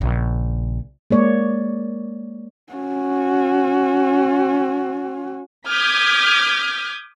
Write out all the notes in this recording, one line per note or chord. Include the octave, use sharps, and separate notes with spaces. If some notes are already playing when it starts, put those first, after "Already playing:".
A#1 C#3
G#3 A#3 C#5 D5
C#4 F#4
D6 D#6 F6 G6 G#6 B6